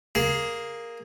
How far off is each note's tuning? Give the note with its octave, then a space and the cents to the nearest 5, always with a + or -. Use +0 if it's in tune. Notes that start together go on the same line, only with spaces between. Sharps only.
A#3 +0 G#4 +0